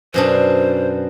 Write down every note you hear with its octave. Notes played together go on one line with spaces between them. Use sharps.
F#2 B2 D4 C5